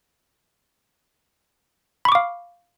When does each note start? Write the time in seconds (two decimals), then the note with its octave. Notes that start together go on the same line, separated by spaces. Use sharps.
2.05 B5
2.09 C#6
2.12 D6
2.15 F5